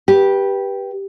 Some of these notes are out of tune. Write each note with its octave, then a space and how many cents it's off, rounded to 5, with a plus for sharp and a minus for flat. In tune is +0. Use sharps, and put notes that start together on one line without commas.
G4 +0 B4 -20